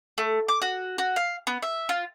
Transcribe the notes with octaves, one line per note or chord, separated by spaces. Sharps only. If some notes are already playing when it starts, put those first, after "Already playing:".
A3
D6
F#4
F#4
F5
B3
E5
F4